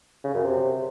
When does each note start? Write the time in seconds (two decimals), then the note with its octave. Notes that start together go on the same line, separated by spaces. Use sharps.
0.24 C#3
0.34 F#2
0.45 C3